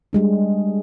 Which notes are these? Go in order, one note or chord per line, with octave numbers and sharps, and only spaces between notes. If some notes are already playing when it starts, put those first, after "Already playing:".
G3 G#3 D4